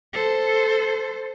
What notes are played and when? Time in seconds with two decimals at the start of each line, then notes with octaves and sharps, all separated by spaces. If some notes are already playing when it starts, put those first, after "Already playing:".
0.13 A4 C5